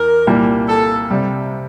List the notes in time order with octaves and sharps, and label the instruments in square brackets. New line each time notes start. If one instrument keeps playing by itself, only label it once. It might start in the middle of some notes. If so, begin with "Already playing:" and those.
Already playing: [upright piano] E2 [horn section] A#4
[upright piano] C2 A#2 G3 A#3
[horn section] A4
[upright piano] C3 G3